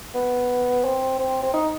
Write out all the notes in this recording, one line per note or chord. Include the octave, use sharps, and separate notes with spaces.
B3
C4
C4
C4
D#4